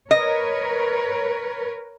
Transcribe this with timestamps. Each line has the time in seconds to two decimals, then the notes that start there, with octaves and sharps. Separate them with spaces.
0.11 A#4 B4 C#5 D#5